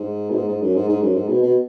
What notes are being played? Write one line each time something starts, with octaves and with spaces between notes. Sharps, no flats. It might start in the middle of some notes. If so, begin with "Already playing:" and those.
Already playing: G#2
B2
G#2
G#2
F#2
G#2
G#2
F#2
G#2
B2
B2